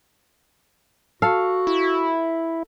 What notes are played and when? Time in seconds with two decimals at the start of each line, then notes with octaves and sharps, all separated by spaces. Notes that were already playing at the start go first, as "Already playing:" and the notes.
1.22 F#4 A4 F5
1.67 E4